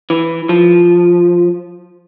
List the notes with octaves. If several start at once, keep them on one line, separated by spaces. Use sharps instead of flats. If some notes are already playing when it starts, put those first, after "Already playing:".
E3
F3